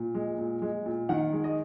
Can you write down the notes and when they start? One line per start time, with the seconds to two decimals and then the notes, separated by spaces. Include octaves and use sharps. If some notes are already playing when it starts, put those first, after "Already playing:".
Already playing: A#2
0.15 G#3
0.38 A#2
0.62 G#3
0.86 A#2
1.09 D#3 F#5
1.33 G#3
1.44 D#5